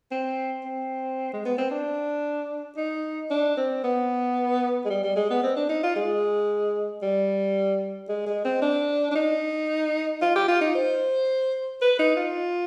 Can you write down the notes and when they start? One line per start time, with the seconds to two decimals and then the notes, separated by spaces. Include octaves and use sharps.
0.11 C4
0.64 C4
1.33 G#3
1.45 B3
1.58 C4
1.71 D4
2.77 D#4
3.30 D4
3.57 C4
3.84 B3
4.85 G#3
4.90 G3
5.03 G3
5.16 G#3
5.30 B3
5.43 C4
5.56 D4
5.69 D#4
5.83 F4
5.96 G#3
7.03 G3
8.09 G#3
8.26 G#3
8.45 C4
8.62 D4
9.11 D4
9.15 D#4
10.22 F4
10.35 G4
10.48 F4
10.61 D#4
10.75 C5
11.82 B4
11.99 D#4
12.16 F4